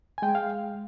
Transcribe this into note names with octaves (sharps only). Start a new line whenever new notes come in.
G#5
G#3 G5
F5